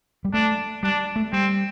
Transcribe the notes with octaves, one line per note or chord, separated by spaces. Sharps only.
G3
A3 D4
G3 D4
A3
G3 C4